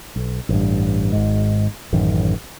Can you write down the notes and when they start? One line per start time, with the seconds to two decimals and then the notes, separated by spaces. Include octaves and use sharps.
0.16 B1
0.49 A1 G2
1.12 G#1 G#2
1.93 A1 F#2 D#3